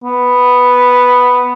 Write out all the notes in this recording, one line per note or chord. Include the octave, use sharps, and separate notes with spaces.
B3